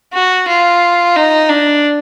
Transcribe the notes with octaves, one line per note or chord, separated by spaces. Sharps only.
F#4
F4
D#4
D4